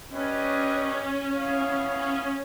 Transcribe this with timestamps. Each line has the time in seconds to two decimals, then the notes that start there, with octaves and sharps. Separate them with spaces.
0.12 C#4 D4 G4 B4 D#5
1.35 B3 E4 G#4 C#5 F5
1.96 C#4